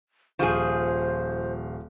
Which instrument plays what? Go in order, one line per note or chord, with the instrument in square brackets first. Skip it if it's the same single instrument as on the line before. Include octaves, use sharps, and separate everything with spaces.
[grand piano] D#1 F5 C#6 [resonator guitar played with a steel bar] F3 G#4 [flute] C5